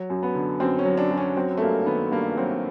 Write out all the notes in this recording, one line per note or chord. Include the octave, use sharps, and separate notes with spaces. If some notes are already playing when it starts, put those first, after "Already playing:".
Already playing: F#3
F#2
B3
D3
F#2 C4
C#4
F#3
D4
F#2
C#4
F#3 C4
A3
G2 A#3
D#3 B3
G2 A#3
F#3 C4